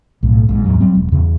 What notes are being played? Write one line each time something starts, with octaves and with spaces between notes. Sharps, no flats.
B1 A2
A#1 G#2
E2 G#2 F#3
F#3 G3 C4
E1
E2 C#3